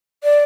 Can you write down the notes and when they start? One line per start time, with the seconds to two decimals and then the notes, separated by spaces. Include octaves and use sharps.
0.24 D5